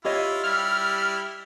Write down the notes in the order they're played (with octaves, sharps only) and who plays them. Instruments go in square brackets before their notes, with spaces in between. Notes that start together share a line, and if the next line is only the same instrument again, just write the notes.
[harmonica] E4 F4 [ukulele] G4 C#5 D#5
[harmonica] G3 E4 [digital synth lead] F6